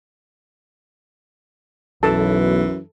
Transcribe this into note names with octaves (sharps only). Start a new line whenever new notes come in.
B1 F#2 E3 A4 A5